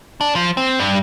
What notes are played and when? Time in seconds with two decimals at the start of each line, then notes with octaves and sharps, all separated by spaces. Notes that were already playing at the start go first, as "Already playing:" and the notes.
0.21 D4
0.36 F3
0.57 C4
0.80 G2